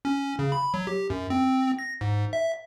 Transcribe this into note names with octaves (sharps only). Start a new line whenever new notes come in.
C#4
C#3
B5
F#3
G4
F#2
C4
A#6
G#2
E5